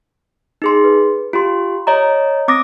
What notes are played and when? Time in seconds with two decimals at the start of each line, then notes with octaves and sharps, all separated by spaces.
0.62 D#4 G#4 C6
0.84 B4
1.33 F4 G4 C6
1.87 C#5 D#5 A#5
2.48 C4 D6 D#6 A#6